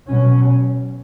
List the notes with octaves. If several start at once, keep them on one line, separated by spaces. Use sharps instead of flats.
B2 F#3 C#4